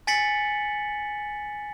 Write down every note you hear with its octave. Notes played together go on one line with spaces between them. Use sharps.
G#5 A6 B6 C#7 F#7